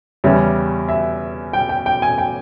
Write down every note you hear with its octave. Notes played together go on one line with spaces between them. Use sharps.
E2 C#3 G3 C#4 E5
E5
G5
G5
G5
G#5
G5